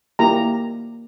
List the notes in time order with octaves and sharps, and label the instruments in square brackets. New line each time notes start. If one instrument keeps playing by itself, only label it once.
[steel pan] A#3 E4 G4 A#5